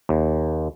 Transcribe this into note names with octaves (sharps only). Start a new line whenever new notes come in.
D#2